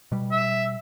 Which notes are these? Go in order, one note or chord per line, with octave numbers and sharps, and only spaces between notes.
B2 G3
E5